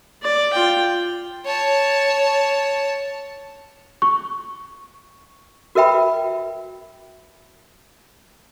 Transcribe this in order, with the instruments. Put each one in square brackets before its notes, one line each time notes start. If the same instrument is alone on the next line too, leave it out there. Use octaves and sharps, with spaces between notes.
[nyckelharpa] D5
F4 G5
[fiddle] C#5 A5
[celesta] C#6
[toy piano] F#4 A#4 B4 E5 G5 B5